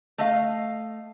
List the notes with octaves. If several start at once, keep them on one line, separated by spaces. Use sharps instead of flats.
A3 D#5 F5